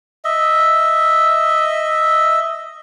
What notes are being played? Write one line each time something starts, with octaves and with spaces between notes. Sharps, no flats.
D#5 E5